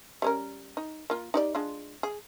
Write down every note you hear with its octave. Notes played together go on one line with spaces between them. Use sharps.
G3 C#4 A#4
D#4
A#3 F4
D#4 G4 D5
G#3 D4 F4
G#4